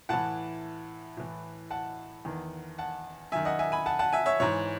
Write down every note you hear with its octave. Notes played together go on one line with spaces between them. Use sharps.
A2 E3 F#5 A5
A2 E3
F#5 A5
E2 D#3
F#5 A5
F#2 D#3 E5 G#5
D#5 F#5
E5 G#5
G#5 B5
F#5 A5
F#5 A5
E5 G#5
C#5 E5
G#2 E3 C#5